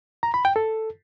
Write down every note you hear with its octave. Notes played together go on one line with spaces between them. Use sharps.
A#5
B5
G5
A4